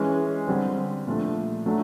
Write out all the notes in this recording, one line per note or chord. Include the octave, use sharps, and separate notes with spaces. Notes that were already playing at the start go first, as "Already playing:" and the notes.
Already playing: E3 G#3 C#4
D3 G3 C4
A#2 F3 A3 D4
F#3 A3 D4